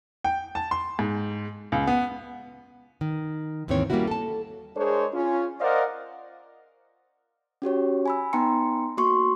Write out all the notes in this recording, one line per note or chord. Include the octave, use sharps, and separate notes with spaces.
G5
A5
C6
G#2
C#2
B3
D#3
D#2 G#2 D#3 E3 C4 C#5
G3 A#3 C4 C#4 E4 F#4
A4 A5
G#3 D4 G#4 A#4 C5 C#5
C#4 F4
A#4 C5 D5 D#5 F5 F#5
C#4 F#4 G4 C#5
G#5 B5 E6
B3 D#4 G5 A#5 C6 C#7
A#3 F#4 C6 C#6